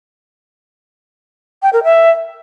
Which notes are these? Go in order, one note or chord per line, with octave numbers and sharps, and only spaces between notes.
G5
A#4
E5